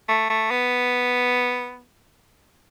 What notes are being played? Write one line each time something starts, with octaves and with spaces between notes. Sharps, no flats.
A3
A3
B3